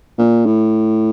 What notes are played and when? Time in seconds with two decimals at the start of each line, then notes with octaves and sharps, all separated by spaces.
0.18 A#2
0.46 A2